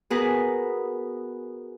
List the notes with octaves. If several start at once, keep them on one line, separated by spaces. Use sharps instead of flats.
B3 F#4 G#4 A#4 B4